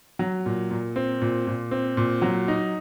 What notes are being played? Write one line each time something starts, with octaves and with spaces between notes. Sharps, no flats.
F#3
A#2
A#2
C4
A#2
A#2
C4
A#2
F#3
D#4